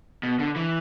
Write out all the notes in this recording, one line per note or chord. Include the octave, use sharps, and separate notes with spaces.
B2
D3
E3